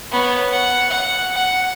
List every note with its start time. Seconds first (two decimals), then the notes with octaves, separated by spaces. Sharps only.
0.12 B3 C#5
0.50 F#5
0.90 F#5
1.34 F#5